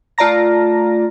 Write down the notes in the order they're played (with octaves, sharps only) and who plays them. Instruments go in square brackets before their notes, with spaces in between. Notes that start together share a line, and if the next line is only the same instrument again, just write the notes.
[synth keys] A3 F4 D5 A5 A#5 A#6